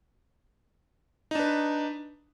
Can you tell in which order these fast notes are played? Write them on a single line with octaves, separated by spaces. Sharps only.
D#4 D4 B4